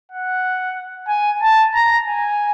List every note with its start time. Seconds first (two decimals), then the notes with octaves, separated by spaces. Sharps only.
0.12 F#5
1.08 G#5
1.42 A5
1.74 A#5
2.07 G#5